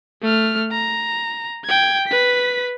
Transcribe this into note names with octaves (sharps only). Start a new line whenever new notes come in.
A3 F6
A#5
G5 G#6
B4 B6